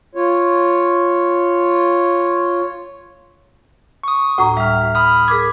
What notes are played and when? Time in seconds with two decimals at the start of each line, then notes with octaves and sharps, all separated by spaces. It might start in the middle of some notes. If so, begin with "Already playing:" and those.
0.15 F4 C#5
4.03 C#6 D#6
4.38 D2 A2 F#4 A#5
4.57 G3 E5 F6
4.95 B5 D#6 F6
5.28 G#4 A#4 D6 G#6 B6